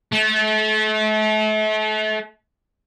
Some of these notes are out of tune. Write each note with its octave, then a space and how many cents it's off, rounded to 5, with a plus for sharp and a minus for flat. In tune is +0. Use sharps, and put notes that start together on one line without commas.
A3 -35